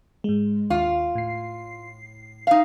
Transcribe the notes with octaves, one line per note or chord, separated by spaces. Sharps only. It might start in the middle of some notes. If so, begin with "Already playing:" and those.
G#2 G#3
D#2 F4
A2 C7
D#4 F5